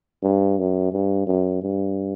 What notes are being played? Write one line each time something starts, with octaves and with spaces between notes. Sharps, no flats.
G2
F#2
G2
F#2
G2